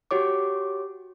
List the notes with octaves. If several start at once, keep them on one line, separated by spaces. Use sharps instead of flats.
F#4 G4 C#5 D6